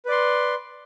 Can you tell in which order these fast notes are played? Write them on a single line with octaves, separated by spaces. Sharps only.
B4 D5 C6